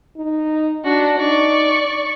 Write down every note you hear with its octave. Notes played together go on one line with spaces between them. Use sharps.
D#4
D4 F#4
D#4 D5 C#6